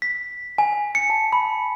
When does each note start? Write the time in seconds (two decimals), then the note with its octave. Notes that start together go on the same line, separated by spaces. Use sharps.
0.02 B6
0.58 G#5
0.95 C#7
1.10 A5
1.33 B5